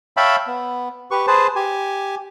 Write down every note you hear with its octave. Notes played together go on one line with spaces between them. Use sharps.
C#5 E5 F5 G5 A5 B5
B3
G4 B4 C#6
G#4 B4 C5 A5
G4 G#5